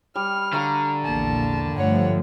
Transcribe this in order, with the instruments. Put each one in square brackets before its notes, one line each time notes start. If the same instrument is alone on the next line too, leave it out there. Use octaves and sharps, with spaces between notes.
[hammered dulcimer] G3 [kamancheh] F6
[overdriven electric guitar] D3 [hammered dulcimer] F5 A#5 C#6
[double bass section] A#1 E2 A#3 [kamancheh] A5
[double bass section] G2 F3 A3 [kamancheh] C#5 F#5